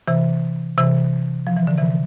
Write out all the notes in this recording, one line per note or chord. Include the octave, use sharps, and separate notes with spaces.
C3 E3
C3 E3
F3
E3
D3
C3 E3